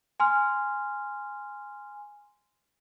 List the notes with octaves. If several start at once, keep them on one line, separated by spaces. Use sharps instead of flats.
G#5 C6 F6